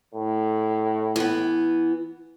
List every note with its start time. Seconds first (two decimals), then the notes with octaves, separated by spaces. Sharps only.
0.14 A2
1.16 E3 B3